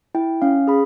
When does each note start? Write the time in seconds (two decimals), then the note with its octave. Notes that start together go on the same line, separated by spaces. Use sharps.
0.15 E4 G5
0.42 C#4 F5
0.68 G#4 B5